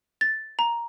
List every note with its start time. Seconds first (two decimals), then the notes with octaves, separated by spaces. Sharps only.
0.21 A6
0.59 A#5